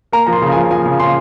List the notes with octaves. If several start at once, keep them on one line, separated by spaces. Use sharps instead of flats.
A#3 A#5
F3 A#5
C6
C#3
A#5
F3 G#5
F3 G#5
C#3
C#3 C6